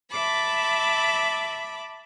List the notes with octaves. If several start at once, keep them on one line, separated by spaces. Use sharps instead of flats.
E5 A5 B5 D6